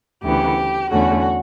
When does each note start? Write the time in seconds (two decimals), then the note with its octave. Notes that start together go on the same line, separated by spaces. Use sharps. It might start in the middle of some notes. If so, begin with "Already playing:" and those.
0.23 D2 C#3 E3 B3 G4
0.90 E2 D3 A3 C#4 F#4